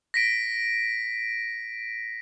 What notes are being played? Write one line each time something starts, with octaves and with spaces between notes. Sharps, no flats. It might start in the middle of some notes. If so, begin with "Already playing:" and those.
A#6 B6 D7